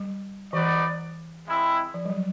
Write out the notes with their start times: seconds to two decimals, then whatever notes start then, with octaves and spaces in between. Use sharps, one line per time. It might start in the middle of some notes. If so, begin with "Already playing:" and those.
Already playing: G3
0.53 E3 D#4 F#4 B4 D5
1.47 G#3 C4 E4
1.94 F3
2.05 G3
2.10 F#3